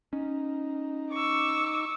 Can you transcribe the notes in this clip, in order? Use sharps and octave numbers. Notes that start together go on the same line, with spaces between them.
C#4 D#4
C#6 D6 E6